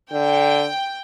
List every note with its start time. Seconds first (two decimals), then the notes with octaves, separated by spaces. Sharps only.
0.12 D3 G5